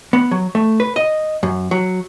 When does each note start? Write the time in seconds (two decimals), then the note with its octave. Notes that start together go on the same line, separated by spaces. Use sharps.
0.13 B3
0.31 F#3
0.55 A3
0.80 B4
0.96 D#5
1.43 F#2
1.71 F#3